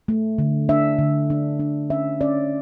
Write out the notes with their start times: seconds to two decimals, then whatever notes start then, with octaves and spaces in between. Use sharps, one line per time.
0.08 A3
0.38 D3
0.69 D4 E5
0.98 D3
1.30 D4
1.59 D4
1.90 C#4 E5
2.21 C#4 D5